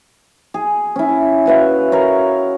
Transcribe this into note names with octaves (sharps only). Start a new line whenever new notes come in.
G#4
C#4 E4
F#4 B4 E5 F5
A#4 C#5